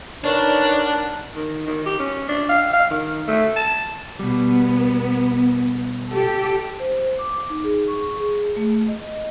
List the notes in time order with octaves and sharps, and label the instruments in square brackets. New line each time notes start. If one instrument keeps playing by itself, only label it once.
[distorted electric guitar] D4 [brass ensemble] D#4 B4 D5 [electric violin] A#4 F#5 [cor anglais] C#5
[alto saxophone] D#3
D#3
G4
C#4
D4
F5
F5
D#3
A3
A5
[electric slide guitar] B2 G3 [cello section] B3
[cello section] G4 A4
[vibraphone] C5
D6
D#4
G#4
C#6
G#4
A3
D#5